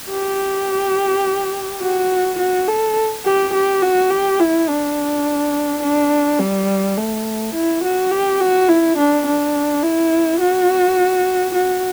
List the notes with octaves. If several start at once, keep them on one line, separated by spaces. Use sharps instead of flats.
G4
F#4
F#4
A4
G4
G4
F#4
G4
E4
D4
D4
G3
A3
E4
F#4
G4
F#4
E4
D4
D4
E4
F#4
F#4